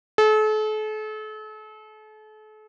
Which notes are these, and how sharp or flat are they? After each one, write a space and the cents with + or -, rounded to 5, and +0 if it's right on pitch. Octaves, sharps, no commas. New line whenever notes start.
A4 -40